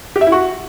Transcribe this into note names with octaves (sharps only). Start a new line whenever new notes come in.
G4
E5
E4
F#4